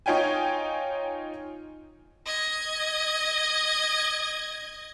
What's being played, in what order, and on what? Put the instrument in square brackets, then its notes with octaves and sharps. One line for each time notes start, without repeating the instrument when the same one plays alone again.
[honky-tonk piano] D#4 F4 C#5 G5 G#5
[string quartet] D#5 G#6